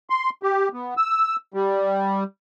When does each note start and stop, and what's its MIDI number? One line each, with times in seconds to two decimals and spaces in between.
0.10 0.30 84
0.43 0.68 67
0.73 0.94 59
0.97 1.36 88
1.54 2.24 55